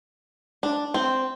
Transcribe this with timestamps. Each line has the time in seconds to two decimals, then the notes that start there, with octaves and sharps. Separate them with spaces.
0.63 D4
0.94 C4